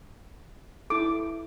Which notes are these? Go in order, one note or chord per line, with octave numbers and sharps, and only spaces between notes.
E4 A4 D6